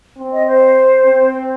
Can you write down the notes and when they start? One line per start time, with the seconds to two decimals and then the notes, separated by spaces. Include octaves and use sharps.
0.18 C4
0.33 D#5
0.47 C5
1.05 C4